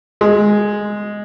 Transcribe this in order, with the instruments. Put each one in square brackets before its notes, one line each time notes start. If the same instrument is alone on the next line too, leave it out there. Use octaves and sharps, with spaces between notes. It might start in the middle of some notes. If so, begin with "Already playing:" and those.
[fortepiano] G#3